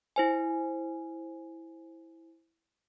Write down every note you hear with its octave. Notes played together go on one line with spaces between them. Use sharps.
E4 C5 G#5